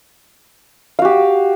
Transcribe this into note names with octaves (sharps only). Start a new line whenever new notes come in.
F#4 G4 F5